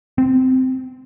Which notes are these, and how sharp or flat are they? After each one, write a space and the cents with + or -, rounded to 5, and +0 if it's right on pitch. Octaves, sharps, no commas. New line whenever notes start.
C4 -15